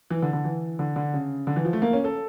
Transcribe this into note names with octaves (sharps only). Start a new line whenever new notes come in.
E3
D3
D3
E3
D3
D3
C#3
D3
E3
F3
A3
A#3
C#4
A4